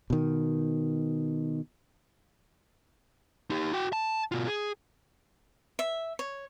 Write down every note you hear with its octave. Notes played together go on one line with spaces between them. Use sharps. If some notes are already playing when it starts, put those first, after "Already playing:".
B2 D#3
D#4 G4
F#4 G5
A5
B2 F4
G#4
E5
C#5